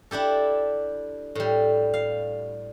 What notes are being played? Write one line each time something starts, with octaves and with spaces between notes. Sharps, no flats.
D4 E4 G4 A4
A2 G3
F5